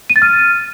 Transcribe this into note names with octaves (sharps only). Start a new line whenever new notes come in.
D#7
A6
F6